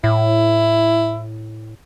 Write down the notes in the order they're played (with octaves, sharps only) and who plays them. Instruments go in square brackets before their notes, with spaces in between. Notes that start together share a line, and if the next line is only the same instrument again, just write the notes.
[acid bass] A2 [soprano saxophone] E4